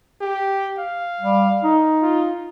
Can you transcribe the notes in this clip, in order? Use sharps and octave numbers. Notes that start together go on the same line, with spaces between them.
G4
F5
G3
D#4
F4